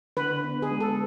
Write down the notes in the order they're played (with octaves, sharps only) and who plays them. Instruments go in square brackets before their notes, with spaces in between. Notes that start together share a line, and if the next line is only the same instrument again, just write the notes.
[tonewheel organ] D3 [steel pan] B4
[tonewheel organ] B3
[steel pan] G#4
[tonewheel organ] G#3
[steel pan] A4